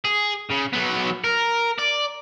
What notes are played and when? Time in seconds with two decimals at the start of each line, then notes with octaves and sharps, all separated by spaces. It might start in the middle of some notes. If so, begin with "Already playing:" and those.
0.05 G#4
0.51 C#3
0.73 F#3 B3
1.24 A#4
1.79 D5